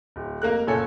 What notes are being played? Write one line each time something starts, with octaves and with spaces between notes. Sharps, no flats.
D1
F1 A#3 A#4 F#6
F#1 A#2 A4 C#5 G#5